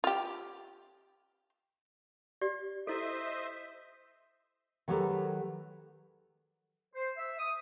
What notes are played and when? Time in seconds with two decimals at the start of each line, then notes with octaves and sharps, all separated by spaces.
0.04 F4 G4
2.42 G4 D5
2.87 E4 A4 C5 D#5 E5
4.88 D#3 F#3 G#3 G4 A4 B4
6.95 C5
7.17 E5
7.39 D#6